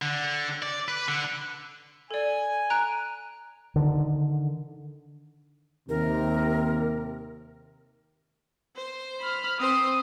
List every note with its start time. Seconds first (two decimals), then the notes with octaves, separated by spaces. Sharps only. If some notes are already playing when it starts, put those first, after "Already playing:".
0.02 D3
0.62 D5
0.88 B4
1.08 D3
2.11 A4 D5 G#5
2.70 A#5 F#6 D7
3.76 D3 D#3
5.89 D#2 C3 A#4
8.76 C5
9.21 B5 F6
9.60 C4 C5 D#6